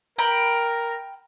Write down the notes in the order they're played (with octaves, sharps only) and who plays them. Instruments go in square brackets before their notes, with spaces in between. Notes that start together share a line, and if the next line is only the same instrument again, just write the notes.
[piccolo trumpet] A#4 [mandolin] G5 A#5 B5